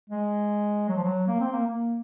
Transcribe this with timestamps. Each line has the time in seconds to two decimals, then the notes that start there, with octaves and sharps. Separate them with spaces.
0.10 G#3
0.89 F#3
0.96 F3
1.04 F#3
1.27 A#3
1.40 C4
1.52 A#3
1.67 A#3